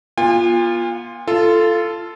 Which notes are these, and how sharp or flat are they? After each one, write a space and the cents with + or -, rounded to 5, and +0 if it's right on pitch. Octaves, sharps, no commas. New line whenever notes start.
B3 -40 F4 +0 G#5 -45
F4 -15 A4 +0